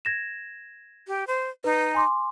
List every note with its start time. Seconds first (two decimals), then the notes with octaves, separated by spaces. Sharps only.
0.05 G#6 A#6 E7
1.07 G4
1.27 C5
1.64 D#4 B4
1.95 G#5 C6 D6